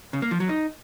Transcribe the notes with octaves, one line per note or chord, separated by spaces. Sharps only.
C#3
A#3
F3
F#3
D#4